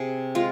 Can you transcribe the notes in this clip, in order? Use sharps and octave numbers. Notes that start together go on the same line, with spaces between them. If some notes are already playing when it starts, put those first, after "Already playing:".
Already playing: C3 G#4
G#3 F4